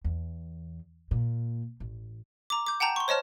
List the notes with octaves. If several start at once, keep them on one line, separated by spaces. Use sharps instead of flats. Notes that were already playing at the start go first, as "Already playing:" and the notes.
E2
A#2
A1
A#5 D6
D6 G6
F#5 G5 A5 A#5 G6
C6 C#6
C5 C#5 D#5 A5 F6